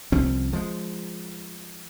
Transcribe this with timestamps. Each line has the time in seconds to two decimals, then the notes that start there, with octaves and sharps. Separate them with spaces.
0.12 C2 F3 C4 C#4
0.53 F3 G#3